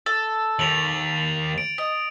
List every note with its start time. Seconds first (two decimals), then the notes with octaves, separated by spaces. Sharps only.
0.06 A4 A6
0.59 D#2 F7 F#7
1.58 D7
1.78 D#5